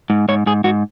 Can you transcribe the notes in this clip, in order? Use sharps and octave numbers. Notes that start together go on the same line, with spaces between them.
G#2
G#2 C#5
G#2 G#4
G#2 F#4